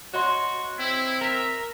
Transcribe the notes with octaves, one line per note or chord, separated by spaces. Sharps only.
F#4 C#5 D#5 C6
C4 E4
A#4 E5